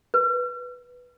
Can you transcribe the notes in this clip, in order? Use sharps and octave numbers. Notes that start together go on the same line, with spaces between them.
B4